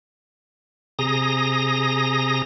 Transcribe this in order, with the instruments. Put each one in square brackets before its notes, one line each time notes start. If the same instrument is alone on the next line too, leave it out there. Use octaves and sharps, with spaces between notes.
[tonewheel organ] C3 G#4 A#5 D#6 A#6